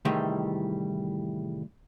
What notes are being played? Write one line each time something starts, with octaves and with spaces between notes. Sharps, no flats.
C2 A2 D#3 E3 G3 G#3